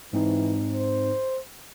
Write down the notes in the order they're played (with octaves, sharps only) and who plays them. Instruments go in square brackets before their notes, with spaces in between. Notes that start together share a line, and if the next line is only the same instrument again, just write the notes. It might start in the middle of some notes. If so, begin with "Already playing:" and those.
[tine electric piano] G#2 C4 D#4 [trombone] E3
[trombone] C5